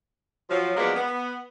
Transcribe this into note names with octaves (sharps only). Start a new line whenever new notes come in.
F3 F#3
F3 F#3 G#3 A#3 B3 D4
B3